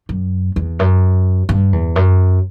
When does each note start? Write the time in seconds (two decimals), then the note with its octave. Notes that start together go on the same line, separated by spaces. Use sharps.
0.09 F#2
0.56 E2
0.79 F#2
1.49 G2
1.73 E2
1.96 F#2